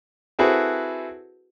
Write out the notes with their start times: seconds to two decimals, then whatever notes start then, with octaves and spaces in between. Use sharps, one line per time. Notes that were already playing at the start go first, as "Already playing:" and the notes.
0.39 C4 E4 F#4 G#4 A4 B4